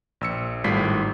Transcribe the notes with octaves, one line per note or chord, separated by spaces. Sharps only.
A#1 E6 C#7
G#1 A2 G3 F4 B6 C7